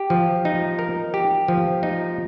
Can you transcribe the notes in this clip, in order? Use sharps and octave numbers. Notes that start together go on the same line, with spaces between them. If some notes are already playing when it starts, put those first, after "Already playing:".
Already playing: G4
F3
D#4
A#4
G4
F3
D#4